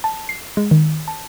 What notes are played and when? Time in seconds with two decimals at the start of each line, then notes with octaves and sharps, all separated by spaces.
0.04 A5
0.29 C7
0.57 G#3
0.71 D#3
1.08 A5